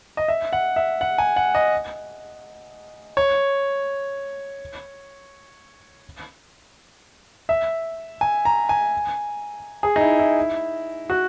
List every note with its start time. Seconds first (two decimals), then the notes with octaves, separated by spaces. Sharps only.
0.17 D#5
0.28 E5
0.53 F#5
0.76 E5
1.01 F#5
1.18 G#5
1.36 F#5
1.55 D#5
3.17 C#5
7.49 E5
8.21 G#5
8.45 A#5
8.69 G#5
9.83 G#4
9.96 D#4
10.01 E4
10.19 E4
11.10 F#4